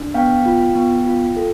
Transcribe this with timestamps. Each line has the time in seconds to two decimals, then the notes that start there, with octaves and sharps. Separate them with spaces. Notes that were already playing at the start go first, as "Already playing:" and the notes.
Already playing: D4
0.14 B3 F5 G5
0.46 F4
0.75 B3
1.07 F4
1.36 A4